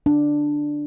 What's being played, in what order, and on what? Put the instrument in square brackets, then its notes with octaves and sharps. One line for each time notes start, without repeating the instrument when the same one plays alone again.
[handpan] D4